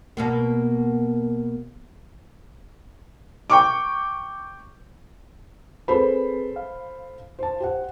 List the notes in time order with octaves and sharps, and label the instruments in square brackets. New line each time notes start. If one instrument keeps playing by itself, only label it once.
[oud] B2 A#3 B3
[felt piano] G5 C#6 D6
[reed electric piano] C4 G#4 B4 [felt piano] A4 C5 B5
[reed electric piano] F5
[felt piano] C5 A5
[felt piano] G4 F#5 [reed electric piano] C5